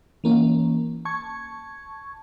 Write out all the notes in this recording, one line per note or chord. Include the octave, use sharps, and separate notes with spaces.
E3 A#3 C#4
A5 C#6 G#6